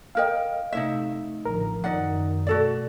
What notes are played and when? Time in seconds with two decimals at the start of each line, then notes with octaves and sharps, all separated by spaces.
0.15 E4 A#4 D#5 F5 G5
0.73 C3 A3 D#4 E4 E5
1.45 A1 D3 F3 A#4
1.84 F#2 D#3 D#4 D5 F#5
2.47 B2 A3 F#4 A4 D5